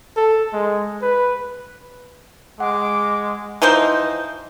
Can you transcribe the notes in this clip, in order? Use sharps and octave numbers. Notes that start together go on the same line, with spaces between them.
A4
G#3
B4
G#3 F#5 D6
E3 F3 D#4 C5